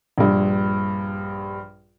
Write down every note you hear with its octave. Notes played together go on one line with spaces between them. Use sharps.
A#1 G2